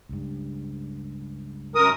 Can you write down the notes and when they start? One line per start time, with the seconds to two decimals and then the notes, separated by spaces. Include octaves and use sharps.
0.09 C#2 G2
1.75 F#2 A#4 D#6